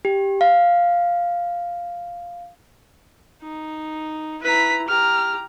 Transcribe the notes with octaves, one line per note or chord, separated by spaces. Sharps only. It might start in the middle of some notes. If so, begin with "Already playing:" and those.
G4
F5
D#4
E4 B4 A#5 B6
G4 A#5 F6